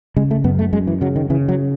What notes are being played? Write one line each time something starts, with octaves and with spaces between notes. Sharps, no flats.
C#3 G#3
A3
F#2 B3
A3
F#2 G#3
E3
C#3 F#3
D#3
C#3 E3
F#3